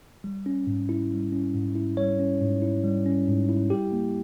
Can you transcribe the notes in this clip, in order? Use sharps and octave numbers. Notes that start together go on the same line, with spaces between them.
G3
C#4
G#2
E4
G3
C#4
G#2
E4
G3 C#5
C#4
G#2
E4
G3
C#4
G#2
E4
G3 G4
A#3